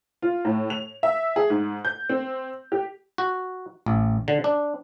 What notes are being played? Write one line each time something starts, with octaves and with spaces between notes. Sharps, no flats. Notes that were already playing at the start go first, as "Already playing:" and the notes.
F4
A2
F7
E5
G#4
G#2
G6
C4
G4
F#4
A1
D3
D4